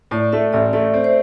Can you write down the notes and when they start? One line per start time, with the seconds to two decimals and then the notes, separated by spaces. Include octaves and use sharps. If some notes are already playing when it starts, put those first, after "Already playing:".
0.11 A2 D5
0.32 A3 E5
0.53 A1 D5
0.73 A3 D5
0.94 C4
1.04 C5